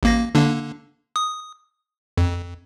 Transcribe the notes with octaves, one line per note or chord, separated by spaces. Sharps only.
A1 A#3 A#6
D3 A#3 D4
D#6
F2